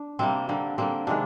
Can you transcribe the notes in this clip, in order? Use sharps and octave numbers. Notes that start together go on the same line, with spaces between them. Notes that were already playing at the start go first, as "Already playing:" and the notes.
Already playing: D4
C3 G3 A#3 C4
D3 G3 A#3
D3 G3 A#3 C4
C3 D#3 G#3 D4